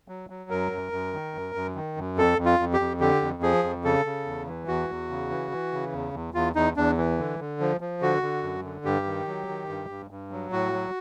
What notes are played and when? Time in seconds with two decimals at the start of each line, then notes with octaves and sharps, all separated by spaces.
0.08 F#3
0.30 F#3
0.50 F#2 A#4
0.71 F#2
0.92 F#2
1.13 D#3
1.34 F#2
1.55 F#2
1.75 D#3
1.97 F#2
2.17 F2 A4
2.38 F2
2.46 F4
2.59 F2
2.73 G4
2.80 F2
3.00 D3 G4
3.21 F2
3.43 F3 G#4
3.64 F2
3.84 C#3 A4
4.05 C#3
4.26 E2
4.47 E3
4.68 E2 F#4
4.89 E2
5.09 C#3
5.30 E3
5.51 E3
5.73 C#3
5.93 E2
6.14 E2
6.34 E2 F4
6.55 E2 D#4
6.77 E2 D4
6.97 E3
7.18 D3
7.39 D3
7.60 F3
7.81 F3
8.01 D3 F#4
8.22 D3
8.43 F#2
8.64 D3
8.85 G2 G4
9.06 D#3
9.27 F#3
9.48 D#3
9.69 G2
9.90 G2
10.11 G2
10.31 F#3
10.52 A2 F#4
10.73 F#3